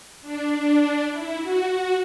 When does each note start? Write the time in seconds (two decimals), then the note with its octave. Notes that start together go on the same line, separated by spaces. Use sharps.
0.22 D4
0.51 D4
1.10 E4
1.39 F#4
1.69 F#4